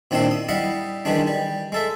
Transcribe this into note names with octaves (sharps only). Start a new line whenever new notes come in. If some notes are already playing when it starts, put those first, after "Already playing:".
A#2 D#3 C4 D4 E4 C6
D#6
G3 E4 D#5 F5 F#5
D#3 E3 G3 G#3 D4
G3
G#3 A4 E5